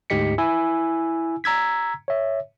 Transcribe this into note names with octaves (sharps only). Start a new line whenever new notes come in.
D2 G#2 G4 D#5 B6 C#7
E4 G#5 E6
A#5 E6 G#6 B6
C#5 E5